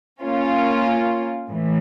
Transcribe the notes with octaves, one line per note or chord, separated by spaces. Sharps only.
A#3 C#4 F4
A2 E3